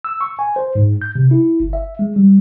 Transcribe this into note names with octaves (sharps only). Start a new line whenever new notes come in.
E6
C#6
G#5
C5
G#2
G6
C3
E4
G1
E5
G#3
G3